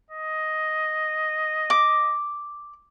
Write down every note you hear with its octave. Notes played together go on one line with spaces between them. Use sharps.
D#5
D6